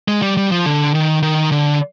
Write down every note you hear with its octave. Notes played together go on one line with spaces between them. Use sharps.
G#3
G3
G3
F3
D3
D#3
D#3
D3